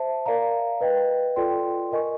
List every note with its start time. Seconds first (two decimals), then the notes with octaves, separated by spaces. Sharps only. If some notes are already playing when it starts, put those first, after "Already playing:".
Already playing: C5 E5 A5
0.26 A#4 D5 F5 A#5
0.81 B4 D#5 G5
1.36 F4 A4 D5 G5 C6
1.92 A#4 D#5 G#5 C#6